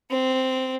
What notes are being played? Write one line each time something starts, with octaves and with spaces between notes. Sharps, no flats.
C4